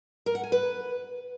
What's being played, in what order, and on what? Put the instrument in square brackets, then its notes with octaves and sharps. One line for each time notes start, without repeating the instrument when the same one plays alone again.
[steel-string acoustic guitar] A#4
F#5
G#5
B4